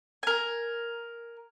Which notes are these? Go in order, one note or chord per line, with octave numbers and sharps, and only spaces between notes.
A#4 G#5